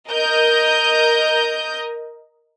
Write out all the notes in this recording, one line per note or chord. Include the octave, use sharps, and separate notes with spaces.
A#4 D#5 G6